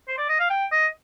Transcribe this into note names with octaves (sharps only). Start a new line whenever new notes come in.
C5
D5
D#5
F5
G5
D#5